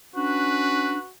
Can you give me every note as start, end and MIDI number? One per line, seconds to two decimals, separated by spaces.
0.15 1.00 61
0.15 0.99 62
0.15 1.10 66
0.15 1.05 71